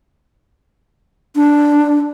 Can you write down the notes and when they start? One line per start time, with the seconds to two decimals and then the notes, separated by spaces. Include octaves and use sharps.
1.36 D4